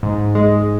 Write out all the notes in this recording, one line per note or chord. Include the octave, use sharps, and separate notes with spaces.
G#2
G#3